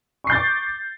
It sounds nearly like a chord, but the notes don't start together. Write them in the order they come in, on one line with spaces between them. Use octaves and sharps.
C#6 C7 G6 A6 D6